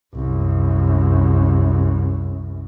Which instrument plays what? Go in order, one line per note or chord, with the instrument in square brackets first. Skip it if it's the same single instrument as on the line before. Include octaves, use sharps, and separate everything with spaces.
[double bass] C2 F#2